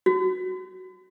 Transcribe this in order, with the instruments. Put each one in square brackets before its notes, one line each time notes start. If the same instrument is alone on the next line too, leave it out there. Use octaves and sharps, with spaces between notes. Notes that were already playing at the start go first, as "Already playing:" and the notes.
[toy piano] F#4